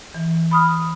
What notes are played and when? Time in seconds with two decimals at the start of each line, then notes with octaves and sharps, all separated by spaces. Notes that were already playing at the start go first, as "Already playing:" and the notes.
0.14 E3
0.51 B5 D#6 F6